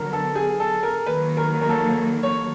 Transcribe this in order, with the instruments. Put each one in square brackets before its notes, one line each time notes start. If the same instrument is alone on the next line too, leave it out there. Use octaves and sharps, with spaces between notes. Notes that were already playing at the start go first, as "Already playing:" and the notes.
Already playing: [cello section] D3 F#3 B3 [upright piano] A4 A#4
[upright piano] A4
G#4
A4
A#4
[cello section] D#3 F#3 A#3 [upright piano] B4
[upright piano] A#4
A#4
A4
C#5